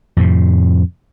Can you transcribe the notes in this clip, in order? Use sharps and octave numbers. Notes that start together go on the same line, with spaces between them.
F2 A2 C3